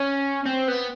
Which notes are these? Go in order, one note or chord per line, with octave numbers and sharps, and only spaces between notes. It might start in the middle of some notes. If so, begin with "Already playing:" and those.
Already playing: C#4
C4
B3